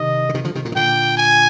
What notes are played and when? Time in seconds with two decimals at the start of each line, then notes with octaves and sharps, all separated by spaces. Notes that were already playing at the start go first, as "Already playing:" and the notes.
Already playing: C3 D#3 D#5
0.29 D3
0.34 C3 D#3
0.44 D3 F3
0.55 C3 D#3
0.65 A#2 D3
0.72 D#3
0.75 A#2 D3 G5
1.17 G#5